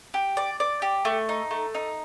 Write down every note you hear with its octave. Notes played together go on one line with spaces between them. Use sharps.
G4
D5
D5
G4
A3
D#4
A3
D#4